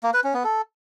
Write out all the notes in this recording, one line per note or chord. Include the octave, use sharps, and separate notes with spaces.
A#3
B4
C#4
B3
A4